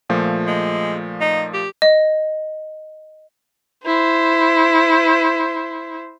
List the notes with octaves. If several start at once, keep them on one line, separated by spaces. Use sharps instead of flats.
A#2 F3 A3
G#3
D#4
G4
D#5
E4 C5